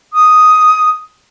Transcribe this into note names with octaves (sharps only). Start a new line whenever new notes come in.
D#6